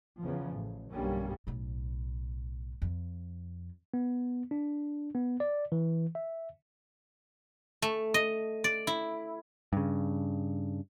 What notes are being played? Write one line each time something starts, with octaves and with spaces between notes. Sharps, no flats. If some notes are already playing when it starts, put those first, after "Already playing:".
E2 C#3 F3
A1
B1 G2 D3 G3 A#3 C#4
B1 A2
F2
B3
D4
B3
D5
E3
E5
A3
D#5
D5
E4
G2 C#3